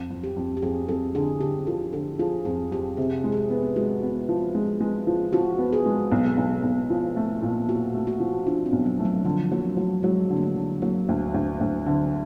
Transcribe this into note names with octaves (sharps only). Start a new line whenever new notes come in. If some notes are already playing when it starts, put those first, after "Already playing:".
Already playing: F2
F2
G4
F2
G4
F2 G#4
F2 A4
D3 G#4
D3 G4
F3 A4
D3 A4
F3 G#4
F2 G#4
F2 G4
C3 G#4
G#3
G#4
G4
B3
G#3 F#4
B3
F3
G#3
G#3
F3
F3 F#4
B3
G#4
G#3
B1
B1
B1
F3
A3
A#2
A#2 F#4
A3
F#4
F3
F3 D4
C4
B1
F#3
A3
F#3
D3 F3
F#3 A#3
F#3 A3
F#3 G#3
D3
A#3
A3
D3
F#3 A#3
D2
D2
D2
D3